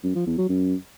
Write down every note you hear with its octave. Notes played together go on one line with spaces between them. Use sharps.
F#2
F3
E2
F#3
F#2